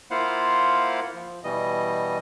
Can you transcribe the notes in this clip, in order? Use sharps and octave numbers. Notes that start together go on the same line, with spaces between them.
A#3 E4 F4 C5 F5 F#5
F3
B2 E3 G3 D#5